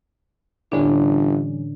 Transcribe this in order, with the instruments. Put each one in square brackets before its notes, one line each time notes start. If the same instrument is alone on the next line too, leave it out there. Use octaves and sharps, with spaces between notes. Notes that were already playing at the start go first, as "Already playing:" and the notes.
[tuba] G1 [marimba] A2 D3 D4 [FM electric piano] E3 G3 C#4